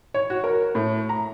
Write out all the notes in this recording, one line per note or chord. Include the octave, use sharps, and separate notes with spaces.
C#5
F#4
A#4
A2
A#5